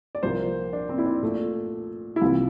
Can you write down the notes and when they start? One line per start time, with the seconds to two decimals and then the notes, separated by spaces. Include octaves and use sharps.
0.15 D5
0.23 C2 A#2 F3 A#3 C5
0.73 D4
0.89 C4
0.98 E4
1.06 D4
1.23 A#2 A3
2.16 E4
2.21 C2 C3 E3 F4